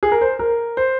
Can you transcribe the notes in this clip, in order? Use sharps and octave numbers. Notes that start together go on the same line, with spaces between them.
G#4
A#4
C5
A#4
C5